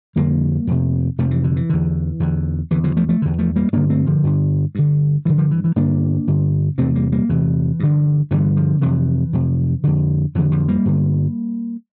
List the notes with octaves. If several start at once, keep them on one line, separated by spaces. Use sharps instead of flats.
F2 D3 G3 A#3
F2 C3
F2 C3 F3 A3
E3
D3
E3
E2 D3
E2 D3
E2 D3 E3
D3 F3
F3 A3
F3 A3
E2 D3
F3 A3
G3 A#3
G2 D3 A#3 D4
A3 C4
D3 F3
G2 D3
G2 D3
G2 D3 E3
D3 F3
E3
E3
G2 D3 A#3 D4
G2 D3
E2 C3 A3 C4
G3 A#3
G3 A#3
E2 C3 E3
G2 D3
G2 D3 E3 G3
D3 F3
F2 C3 E3
F2 C3
F2 D3
F2 D3 E3
D3 F3
G3 A#3
G2 D3